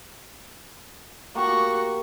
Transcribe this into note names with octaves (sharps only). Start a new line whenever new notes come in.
A#3 F#4 G4 C#6